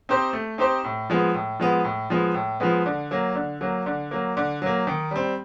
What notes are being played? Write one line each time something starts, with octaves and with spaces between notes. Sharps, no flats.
C4 D#4 G4 C5
A3
C4 D#4 G4 C5
A2
F3 G#3 B3
A2
F3 G#3 B3
A2
F3 G#3 B3
A2
F3 G#3 B3
D3
F#3 A#3
D3
F#3 A#3
D3
F#3 A#3
D3
F#3 A#3
D#3
G3 C4